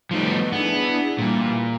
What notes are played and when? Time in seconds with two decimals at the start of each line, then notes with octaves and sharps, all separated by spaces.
0.11 F3 G3 A3 B3 D#4
0.53 B3 D4 E4 G#4
1.19 A#2 E3 G3